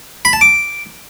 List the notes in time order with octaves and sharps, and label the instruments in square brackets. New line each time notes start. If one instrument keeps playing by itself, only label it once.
[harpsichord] B5
A5
D6